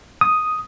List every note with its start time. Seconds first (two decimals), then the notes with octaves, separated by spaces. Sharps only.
0.21 D#6